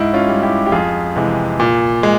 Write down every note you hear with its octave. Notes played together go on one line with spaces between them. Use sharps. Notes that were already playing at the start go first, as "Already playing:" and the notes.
Already playing: G#2 E4
C#4 F4
G3
E4 G4
G4
F2 F4 G#4
C3 E3 G#3
A#2
G#3